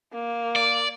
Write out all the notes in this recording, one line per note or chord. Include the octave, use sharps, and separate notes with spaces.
A#3
D5